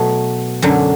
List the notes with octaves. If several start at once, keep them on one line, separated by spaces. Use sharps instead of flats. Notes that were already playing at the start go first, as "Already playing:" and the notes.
Already playing: B2 F#3 A3
F#2 D3 F#3